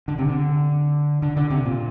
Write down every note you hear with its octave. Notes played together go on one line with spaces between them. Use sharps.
D3
C3
D3
D3
D3
C3
A#2